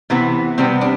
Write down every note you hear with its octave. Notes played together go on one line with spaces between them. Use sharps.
C3 E3 B3
C3 G3 B3 C4
D4